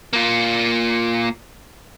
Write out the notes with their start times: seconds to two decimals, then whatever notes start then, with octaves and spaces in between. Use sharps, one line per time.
0.13 A#3 F4